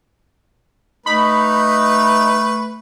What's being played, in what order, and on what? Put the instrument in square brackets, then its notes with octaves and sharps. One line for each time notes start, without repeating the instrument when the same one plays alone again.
[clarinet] A3 [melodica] D#4 [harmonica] B4 [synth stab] B5